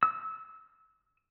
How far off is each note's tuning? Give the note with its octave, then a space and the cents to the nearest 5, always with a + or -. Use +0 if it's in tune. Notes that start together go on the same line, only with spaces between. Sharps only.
E6 -25